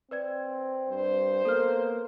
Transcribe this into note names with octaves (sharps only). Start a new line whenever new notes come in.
C4 B4 D5 G#6
G2 C5
A#3 B3 A4 F6